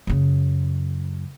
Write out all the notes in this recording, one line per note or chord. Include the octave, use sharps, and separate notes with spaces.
F#2 C#3